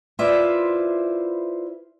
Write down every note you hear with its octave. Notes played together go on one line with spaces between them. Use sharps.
E4 F4 B4 C5 D5 E5